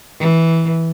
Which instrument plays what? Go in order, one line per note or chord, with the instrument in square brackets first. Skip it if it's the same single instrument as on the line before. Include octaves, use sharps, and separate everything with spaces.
[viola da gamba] E3